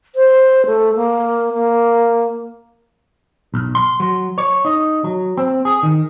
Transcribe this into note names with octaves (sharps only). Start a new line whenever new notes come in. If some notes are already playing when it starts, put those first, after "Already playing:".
C5
A3
A#3
A#3
B1
C6
F#3
C#5
D#4
F#3
C4
G#4
D#3